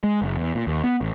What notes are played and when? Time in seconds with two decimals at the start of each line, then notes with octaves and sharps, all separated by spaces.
0.04 G#3
0.22 F#1
0.37 E2
0.55 A#2
0.67 D#2
0.84 B3
1.01 A1